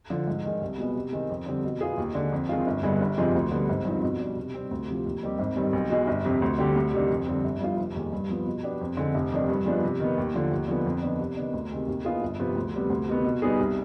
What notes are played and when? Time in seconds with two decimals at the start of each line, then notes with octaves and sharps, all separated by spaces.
0.10 D3 F3
0.27 G#2
0.44 D#3 G#3
0.61 C2
0.78 B2 G#3 B3
0.95 C3
1.12 D#3 G#3 C4
1.30 F2
1.46 D3 G3 C4
1.64 B2
1.81 B3 F4 G#4
1.97 D#2
2.15 D3 G#3 D4
2.32 F2
2.49 D#3 G#3 C4 F4
2.67 G1
2.83 G2 D3 G#3 B3
3.00 G1
3.18 F2 C3 F3 G#3
3.35 D2
3.52 D3 G3 B3
3.69 G#1
3.85 G2 F3 C4 D#4
4.02 B2
4.19 G3 D4
4.37 C3
4.54 G3 C4
4.71 D2
4.88 C3 F3
5.06 D#2
5.23 D#3 G3 C4 G4
5.39 G#1
5.56 G2 D#3 G3 C4
5.73 B1
5.90 B2 G#3
6.07 G1
6.25 F2 C3
6.42 D2
6.59 D3 G3 C4 G4
6.76 D2
6.93 C3 D#3 G3 D4
7.10 F2
7.26 D3 G3 C4
7.44 G1
7.61 G2 F3 B3 F4
7.78 F1
7.96 D#2 D#3 G#3
8.13 G2
8.29 F3 B3
8.46 B2
8.63 B3 D4 G4
8.81 F2
8.97 D3 G#3 C4
9.15 F1
9.32 F2 D#3 G3 D4
9.48 G2
9.66 F3 G#3 B3 D4
9.83 C3
10.00 D#3 B3
10.18 D#2
10.34 D3 F3
10.51 D#2
10.68 D3 F3 G#3 B3
10.86 F2
11.02 D#3 B3 D4
11.20 C3
11.37 D#3 B3 D4
11.53 D2
11.71 C3 D#3 G#3 C4
11.88 D#2
12.05 D#3 B3 F4 G#4
12.21 G1
12.39 F2 C3 F3 B3
12.56 D2
12.74 C3 G3 B3
12.90 D2
13.08 C3 D#3 B3
13.24 B2
13.42 G3 B3 D#4 G#4
13.59 C2